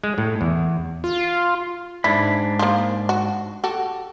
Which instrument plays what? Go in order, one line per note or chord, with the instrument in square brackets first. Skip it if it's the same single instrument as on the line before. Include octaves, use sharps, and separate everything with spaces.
[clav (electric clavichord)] G#3
A2
E2
[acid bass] F4
[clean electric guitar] G#2 D4 B5 [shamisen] E4
[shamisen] F3 A#3
F#4
F#4 G4 A4